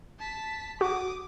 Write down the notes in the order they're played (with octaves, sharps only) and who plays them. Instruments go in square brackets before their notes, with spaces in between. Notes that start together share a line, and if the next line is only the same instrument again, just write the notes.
[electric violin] A5 B6
[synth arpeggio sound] F#4 [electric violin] D6 D#6